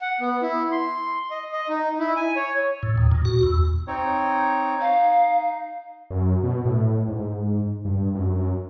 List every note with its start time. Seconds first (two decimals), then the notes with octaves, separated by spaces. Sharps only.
0.01 F#5
0.20 B3
0.42 E4
0.71 C6
1.31 D#5
1.53 D#5
1.69 D#4
1.99 E4
2.16 G#5
2.36 C#5
2.83 A2
2.97 D#2
3.12 A#2
3.25 F#4
3.43 E2
3.87 C4 D#4 C#5
4.81 D#4 F5
6.11 F#2
6.43 B2
6.65 A2
7.09 G#2
7.85 G2
8.15 F#2